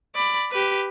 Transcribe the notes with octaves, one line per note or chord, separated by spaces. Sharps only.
D5 B5
G4 B4